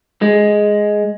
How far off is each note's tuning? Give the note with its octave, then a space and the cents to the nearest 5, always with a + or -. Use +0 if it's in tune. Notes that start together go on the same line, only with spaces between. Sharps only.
G#3 +5